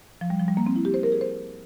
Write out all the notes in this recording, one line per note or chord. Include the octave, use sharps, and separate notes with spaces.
F3
G3
F3
G3
A#3
C4
E4
G4
C5
A#4
G#4
C5